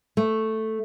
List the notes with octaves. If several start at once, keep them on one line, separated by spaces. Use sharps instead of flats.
A3